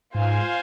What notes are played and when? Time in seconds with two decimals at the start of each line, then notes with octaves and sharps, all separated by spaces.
0.14 G#2 F4 C5 F5 G#5